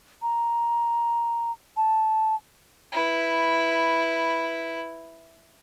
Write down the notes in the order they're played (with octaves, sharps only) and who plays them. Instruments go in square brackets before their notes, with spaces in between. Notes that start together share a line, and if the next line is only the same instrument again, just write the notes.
[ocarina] A#5
A5
[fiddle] E4 B4